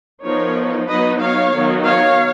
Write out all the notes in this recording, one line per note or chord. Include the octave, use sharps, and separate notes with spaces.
F3 B3 D#4 A#4 C#5
F#3 B3 D#4 B4 D#5
C#5 F5
D#3 F#3 B3 D#4
C#5 F5